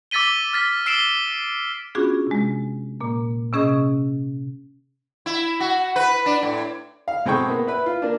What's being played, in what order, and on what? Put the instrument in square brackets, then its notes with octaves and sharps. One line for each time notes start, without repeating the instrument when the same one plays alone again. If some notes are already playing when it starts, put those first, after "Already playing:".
[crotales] D6 E6 A6 B6 D#7 G7
F6 A6 B6
E6 C7 D7 E7 G7
[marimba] B3 C#4 D4 F4 F#4 G#4
C3 G#3
A#2 A#3
C3 C#4 G#4 D#5 D#6
[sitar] E4
F#4
B4
D4
A2
[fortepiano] F5
B2 G#3 C4 A4 G5 C#6
A#3 B3
E4 B4
F4
A#3 D4